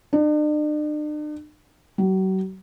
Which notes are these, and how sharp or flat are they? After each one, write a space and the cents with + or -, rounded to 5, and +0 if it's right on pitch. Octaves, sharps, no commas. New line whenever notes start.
D4 +45
F#3 +40